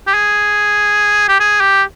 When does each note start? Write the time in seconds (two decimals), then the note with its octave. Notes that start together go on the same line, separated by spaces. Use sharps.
0.07 G4
0.14 G#4
1.29 G4
1.40 G#4
1.61 G4